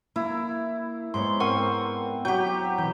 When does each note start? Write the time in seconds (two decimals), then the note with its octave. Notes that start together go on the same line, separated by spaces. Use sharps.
0.16 A#3 E4
1.14 G#2 B3 C#5 C6
1.40 C4 A#4 F#5 C#6
2.25 F#3 G4 G6
2.47 C4
2.78 B2 E3 G6